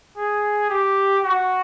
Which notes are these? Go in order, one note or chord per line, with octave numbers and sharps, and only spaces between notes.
G#4
G4
F#4